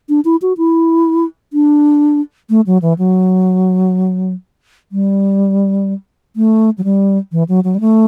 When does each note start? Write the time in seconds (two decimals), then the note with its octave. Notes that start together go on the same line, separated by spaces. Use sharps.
0.09 D4
0.25 E4
0.42 F#4
0.58 E4
1.53 D4
2.50 A3
2.67 F#3
2.82 E3
2.98 F#3
4.92 G3
6.36 A3
6.78 F#3
6.84 G3
7.32 E3
7.49 F#3
7.64 F#3
7.75 G3
7.80 A3